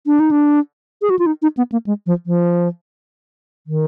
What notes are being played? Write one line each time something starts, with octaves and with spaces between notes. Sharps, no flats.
D4
D#4
D4
G#4
F#4
F4
D#4
D#4
B3
A#3
G#3
F3
F3
D#3